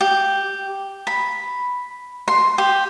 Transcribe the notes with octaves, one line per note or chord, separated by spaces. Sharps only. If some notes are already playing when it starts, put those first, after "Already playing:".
G4
B5
C6
G4